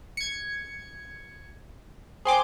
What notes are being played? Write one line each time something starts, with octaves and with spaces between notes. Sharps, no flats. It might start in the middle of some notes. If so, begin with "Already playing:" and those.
G#6 C#7
G#4 C5 G5 G#5 C6 D6